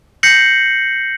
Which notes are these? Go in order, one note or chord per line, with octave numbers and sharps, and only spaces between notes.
G6 A#6 C7 C#7 F#7